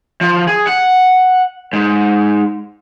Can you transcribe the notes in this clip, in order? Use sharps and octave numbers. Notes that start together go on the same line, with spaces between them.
F3
G#4
F#5
G#2